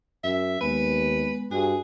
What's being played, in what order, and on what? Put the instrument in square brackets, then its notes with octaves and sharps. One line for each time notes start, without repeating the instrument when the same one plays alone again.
[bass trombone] F#2 [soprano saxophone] E5
[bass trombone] D#2 [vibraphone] G#3 B3 [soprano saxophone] B4
[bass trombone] G2 [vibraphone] F#4 [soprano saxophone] G#4